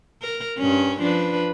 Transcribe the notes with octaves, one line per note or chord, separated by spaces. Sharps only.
A#4
G2 C#4
F3 D4 B4